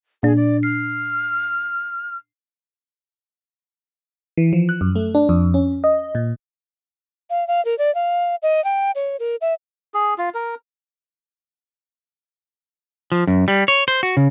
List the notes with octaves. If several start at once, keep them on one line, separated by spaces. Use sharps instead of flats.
A#2 D4 G#4
D5
F6 C7
E3
F3
F#6
F#2
A3
D4
F2
C#4
D#5
A#2
F5
F5
A#4
D5
F5
D#5
G5
C#5
A#4
E5
G#4
F4
A#4
F3
F#2
G3
C#5
C5
F#4
C#3